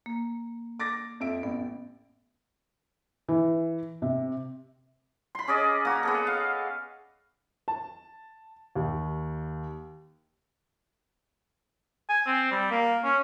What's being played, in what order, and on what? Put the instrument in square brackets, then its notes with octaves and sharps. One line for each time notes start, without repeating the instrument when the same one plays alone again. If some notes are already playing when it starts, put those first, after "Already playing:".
[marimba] A#3
[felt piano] D6 A6 A#6
F2 E5 D7
[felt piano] A1 [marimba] B3
[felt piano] E3
C3
[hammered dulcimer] B5 C6
C#4 G#4 D5 D#5
A#3 F#4
B3 G#4 A4
F5
[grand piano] A5
D#2
[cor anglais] G#5
C4
G3
A#3
C#4